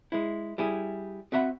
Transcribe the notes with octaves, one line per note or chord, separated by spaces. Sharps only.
G#3 E4
G3 E4 G#4
C4 F#4 E5 F#5 B5